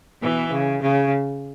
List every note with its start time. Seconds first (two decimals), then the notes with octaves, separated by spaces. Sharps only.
0.22 B2 E3
0.51 C#3
0.82 C#3